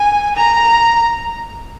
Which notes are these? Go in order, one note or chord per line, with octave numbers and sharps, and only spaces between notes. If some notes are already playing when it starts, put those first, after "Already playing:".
Already playing: G#5
A#5